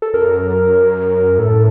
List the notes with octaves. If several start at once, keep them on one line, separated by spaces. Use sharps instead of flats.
A4
F#2 A#4
A2 A4